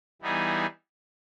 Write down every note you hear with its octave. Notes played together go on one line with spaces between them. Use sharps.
E3 G3 B3 D#4 G#4